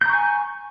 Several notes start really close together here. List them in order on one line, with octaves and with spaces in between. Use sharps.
G6 A#5 C#6 G#5